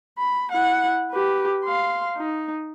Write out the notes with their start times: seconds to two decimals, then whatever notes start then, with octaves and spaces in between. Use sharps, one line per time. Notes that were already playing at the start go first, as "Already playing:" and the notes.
0.18 B5
0.51 E4 F#5
1.11 G4 B4
1.65 F5 C6
2.17 D#4